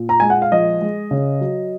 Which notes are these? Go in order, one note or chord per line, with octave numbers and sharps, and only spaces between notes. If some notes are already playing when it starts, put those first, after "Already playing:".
Already playing: A#2
A#5
G#3 G#5
F#5
F5
F3 D#5
G#3
C#3
F#3